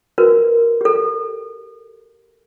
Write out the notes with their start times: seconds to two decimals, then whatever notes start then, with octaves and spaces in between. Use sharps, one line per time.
0.18 F#4 A#4 B4
0.81 G4 A4